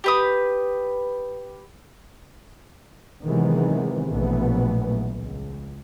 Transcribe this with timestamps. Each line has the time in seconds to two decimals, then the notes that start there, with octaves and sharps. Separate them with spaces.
0.04 G4 B4 D#6
3.26 C3 D#3 E3 F#3 G#3 B3
4.11 A#1 B2 E3 F#3 A3 B3
5.14 C#2